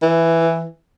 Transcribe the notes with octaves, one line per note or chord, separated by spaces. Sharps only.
E3